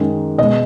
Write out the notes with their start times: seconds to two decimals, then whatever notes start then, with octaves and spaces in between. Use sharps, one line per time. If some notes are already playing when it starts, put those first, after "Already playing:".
Already playing: F#2 D#3 G#3
0.38 B2 G#3 D#5